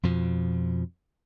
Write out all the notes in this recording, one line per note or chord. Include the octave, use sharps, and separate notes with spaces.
F2 B2 F3